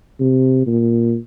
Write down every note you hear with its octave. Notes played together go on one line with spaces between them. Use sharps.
C3
A#2